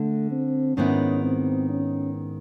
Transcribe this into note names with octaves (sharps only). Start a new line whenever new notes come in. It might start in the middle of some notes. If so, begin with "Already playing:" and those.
Already playing: D3 A3
C4
G#2 D#3 G#3 B3 C#4 E4
C4
C#4